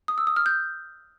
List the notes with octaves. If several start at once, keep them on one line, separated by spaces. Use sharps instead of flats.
D#6
E6
D#6
F6
G6